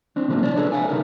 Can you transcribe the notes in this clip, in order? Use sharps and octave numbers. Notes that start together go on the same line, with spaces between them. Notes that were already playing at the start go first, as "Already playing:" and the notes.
C4 D4
C3 F3 G#3 A#3 C#4
D4 C#5 D5
D4 G#4 A4 B4
E5 F5 G#5
C3 D#4 G#4 A#4